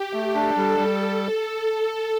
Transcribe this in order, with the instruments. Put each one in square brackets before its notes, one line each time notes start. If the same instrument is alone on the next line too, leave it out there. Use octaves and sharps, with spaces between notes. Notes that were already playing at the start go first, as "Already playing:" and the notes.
Already playing: [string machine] G4
[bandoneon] A3
[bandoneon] D4 [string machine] A4
[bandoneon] G3
G3